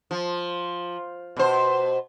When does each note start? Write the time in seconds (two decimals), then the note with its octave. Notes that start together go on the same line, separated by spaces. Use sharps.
0.11 F3
1.37 B2 C5